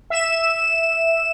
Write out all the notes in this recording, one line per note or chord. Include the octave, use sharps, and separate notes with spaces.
E5 E7